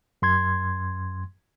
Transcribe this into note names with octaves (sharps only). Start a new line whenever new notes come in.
F#2 C6 G#6